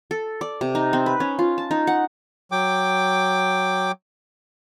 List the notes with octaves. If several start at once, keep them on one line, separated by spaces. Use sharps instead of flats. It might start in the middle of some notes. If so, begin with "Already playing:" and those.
A4
D5
C3
D#4
C4
B4
C#4
F4
A5
D#4
F#5
F#3 G5 D6